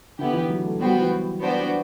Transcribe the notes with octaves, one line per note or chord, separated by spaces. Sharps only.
D3 B3 E4 G4
E3
F#3
A3
G3 B3 F#4 C5 G5
F#3
E3
B3 D4 F#4 C5 G5